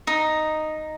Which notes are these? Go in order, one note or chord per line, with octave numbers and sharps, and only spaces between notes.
D#4